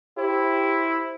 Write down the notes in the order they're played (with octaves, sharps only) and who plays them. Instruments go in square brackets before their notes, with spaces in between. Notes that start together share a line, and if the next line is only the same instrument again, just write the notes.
[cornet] E4 [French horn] G4 [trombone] C5